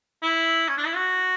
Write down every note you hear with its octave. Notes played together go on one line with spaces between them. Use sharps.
E4
C#4
D4
E4
F#4